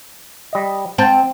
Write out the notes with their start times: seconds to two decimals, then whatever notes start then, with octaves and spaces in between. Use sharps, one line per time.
0.53 G3 D#5
0.98 C4 G5 A5